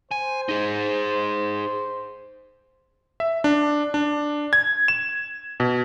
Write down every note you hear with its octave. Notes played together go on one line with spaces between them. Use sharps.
C5 G#5
D#4 G#4
E5
D4
D4
G#6
E7
B2